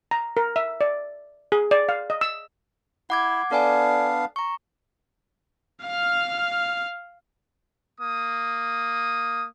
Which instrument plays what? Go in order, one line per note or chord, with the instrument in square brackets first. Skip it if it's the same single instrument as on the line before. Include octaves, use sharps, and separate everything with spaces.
[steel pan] A#5
A#4
E5
D5
G#4
D5
F5
D#5
E6
[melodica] E4 [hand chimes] F#5 D6 G#6
[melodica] B3 D4 F5 [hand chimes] A4 D5 G#5
[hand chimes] A#5 C#6
[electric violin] F5 F6
[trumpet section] A#3 D#6